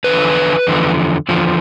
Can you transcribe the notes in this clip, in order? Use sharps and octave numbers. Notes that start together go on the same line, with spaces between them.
E2 D3 F3 B4
E2 D3 F3
E2 D3 F3